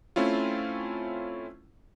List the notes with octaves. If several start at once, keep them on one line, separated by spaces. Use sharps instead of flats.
A3 C4 C#4 E4 F4